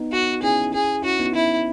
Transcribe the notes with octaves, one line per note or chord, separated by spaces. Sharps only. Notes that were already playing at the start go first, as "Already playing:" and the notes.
Already playing: B3 D#4
F#4
C#4 E4 G#4
G#4
C#4 E4 F#4
B3 D#4
E4